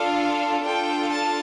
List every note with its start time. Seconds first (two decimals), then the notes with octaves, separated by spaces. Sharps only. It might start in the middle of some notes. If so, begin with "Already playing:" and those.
Already playing: D4 F4 A4 F5
0.63 D4 F4 A4 G5
1.11 A5